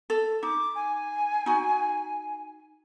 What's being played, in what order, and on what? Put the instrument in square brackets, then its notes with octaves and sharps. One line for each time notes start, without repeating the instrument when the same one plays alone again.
[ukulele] A4
[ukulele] D#4 [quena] D6
[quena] G#5
[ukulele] D#4 F#4